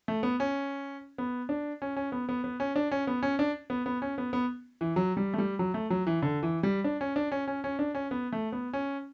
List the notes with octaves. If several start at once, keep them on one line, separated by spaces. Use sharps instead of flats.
A3
B3
C#4
B3
D4
C#4
C#4
B3
B3
B3
C#4
D4
C#4
B3
C#4
D4
B3
B3
C#4
B3
B3
E3
F#3
G3
A3
G3
F#3
A3
F#3
E3
D3
E3
G3
D4
C#4
D4
C#4
C#4
C#4
D4
C#4
B3
A3
B3
C#4